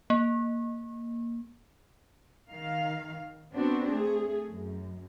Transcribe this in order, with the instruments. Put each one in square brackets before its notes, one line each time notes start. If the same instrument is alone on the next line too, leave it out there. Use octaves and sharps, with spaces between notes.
[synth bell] A#3
[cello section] D#3 F5
B3 C4 D4 F#4
A3 G#4
F#2